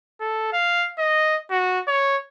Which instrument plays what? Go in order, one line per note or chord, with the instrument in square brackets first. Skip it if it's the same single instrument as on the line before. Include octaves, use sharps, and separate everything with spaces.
[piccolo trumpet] A4
F5
D#5
F#4
C#5